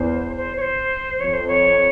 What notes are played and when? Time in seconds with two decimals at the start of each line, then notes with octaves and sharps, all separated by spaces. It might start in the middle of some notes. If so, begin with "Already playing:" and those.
Already playing: E2 C5
0.36 C5
0.57 C#5
0.61 C5
1.20 F2 C#5
1.33 C5
1.48 C#5